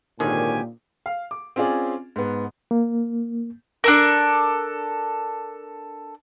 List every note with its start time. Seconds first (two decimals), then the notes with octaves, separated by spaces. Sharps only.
0.20 G#1 A#2 D3 D#3 G4 C#5 G#5
1.06 F5
1.31 D6
1.56 C4 C#4 F4 G#4 D5
2.16 G#2 B3
2.71 A#3
3.84 D4 A4 A#4